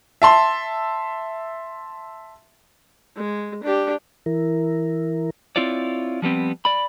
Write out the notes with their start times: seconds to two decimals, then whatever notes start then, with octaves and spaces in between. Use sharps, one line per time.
0.22 E5 A5 C6
3.16 G#3
3.64 D4 G4
4.26 E3 E4 A#4
5.56 C4 E4 F4 C#5 D5
6.22 F3 G3 B3 C4
6.65 D5 B5